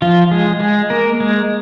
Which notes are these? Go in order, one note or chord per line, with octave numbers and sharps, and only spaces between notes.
F3 F4
G#3 G#4
G#3 G#4
A#3 A#4
G#3 G#4